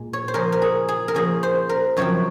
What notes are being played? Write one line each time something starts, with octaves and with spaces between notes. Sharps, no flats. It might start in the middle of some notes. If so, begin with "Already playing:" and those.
Already playing: A#2 G#3
C#5
C5
C#3 F3 A#3 C#4 A#4
A#4
G#4
G#4
A#4
C#3 F3 A#3 C#4 G#4
C5
A#4
F#2 C#3 F3 C4 C#5